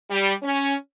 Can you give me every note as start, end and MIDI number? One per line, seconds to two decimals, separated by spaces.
0.10 0.33 55
0.42 0.74 61